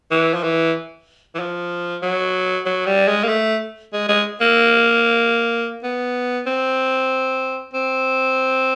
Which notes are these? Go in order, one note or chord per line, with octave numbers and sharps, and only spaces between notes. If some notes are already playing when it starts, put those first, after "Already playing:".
E3
F3
E3
E3
F3
F#3
F#3
G3
G#3
A#3
A3
G#3
G#3
A#3
B3
C4
C4